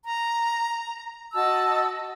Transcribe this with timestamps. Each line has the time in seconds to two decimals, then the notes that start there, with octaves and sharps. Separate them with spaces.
0.05 A#5
1.34 F#4 D#5 A5 E6